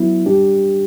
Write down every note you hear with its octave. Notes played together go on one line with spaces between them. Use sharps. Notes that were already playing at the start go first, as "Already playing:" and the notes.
Already playing: F#3 B3 E4
G3 D4 G4